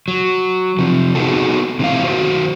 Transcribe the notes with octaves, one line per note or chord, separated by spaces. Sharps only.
F#3
C3 F3
B3 D#4 F#4 G#4 A4
C3 E3 A3 F5
D#3 F#3 F#4 C5